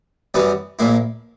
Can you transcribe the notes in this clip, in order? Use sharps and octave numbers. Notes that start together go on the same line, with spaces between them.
F#2 E3 G3 B3
A#1 A#2 A#3 E4